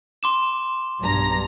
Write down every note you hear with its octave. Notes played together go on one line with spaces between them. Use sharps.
C6 D6 E7
B1 G2 A#5